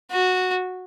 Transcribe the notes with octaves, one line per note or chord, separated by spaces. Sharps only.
F#4